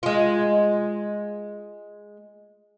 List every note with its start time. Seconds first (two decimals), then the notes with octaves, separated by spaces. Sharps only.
0.03 G#3 F4